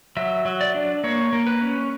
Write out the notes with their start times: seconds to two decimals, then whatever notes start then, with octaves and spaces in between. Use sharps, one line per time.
0.17 F#3 E5
0.45 F#3
0.61 D5
0.75 D4
1.04 A#3 C#5
1.33 A#3
1.47 B4
1.61 C#4